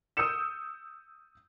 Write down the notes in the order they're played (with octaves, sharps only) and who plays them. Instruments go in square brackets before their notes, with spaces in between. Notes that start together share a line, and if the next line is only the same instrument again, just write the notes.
[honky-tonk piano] D#6 E6 G6 C#7 E7